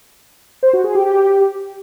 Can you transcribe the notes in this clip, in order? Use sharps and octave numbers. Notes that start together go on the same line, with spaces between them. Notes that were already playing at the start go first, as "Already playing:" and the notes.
C5
F#4
G#4
G4
G4